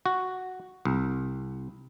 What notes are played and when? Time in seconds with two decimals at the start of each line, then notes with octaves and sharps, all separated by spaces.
0.06 F#4
0.85 C2